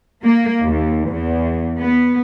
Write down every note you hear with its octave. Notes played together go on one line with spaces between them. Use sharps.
A#3
D#2
E2
B3